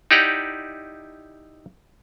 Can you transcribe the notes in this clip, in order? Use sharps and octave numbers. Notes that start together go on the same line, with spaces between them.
D#4 E4 G4 D5 F#5 A#5